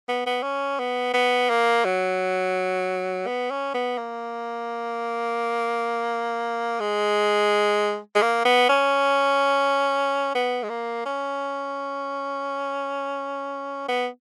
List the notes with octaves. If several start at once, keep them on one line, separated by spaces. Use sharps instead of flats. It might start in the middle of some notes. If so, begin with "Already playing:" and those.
B3
B3
C#4
B3
B3
A#3
F#3
B3
C#4
B3
A#3
G#3
G#3
A#3
B3
C#4
B3
G#3
A#3
C#4
B3